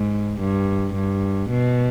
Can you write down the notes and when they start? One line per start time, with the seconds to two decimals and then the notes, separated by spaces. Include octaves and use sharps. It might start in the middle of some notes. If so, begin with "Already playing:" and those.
Already playing: G#2
0.40 G2
0.94 G2
1.49 B2